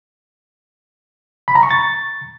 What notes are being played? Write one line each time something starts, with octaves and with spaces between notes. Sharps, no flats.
B5
A#5
C#6
A6